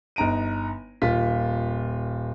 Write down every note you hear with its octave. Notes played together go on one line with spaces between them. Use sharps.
G1 D#4 A#5 D7 D#7
D#1 A#3 F4 B6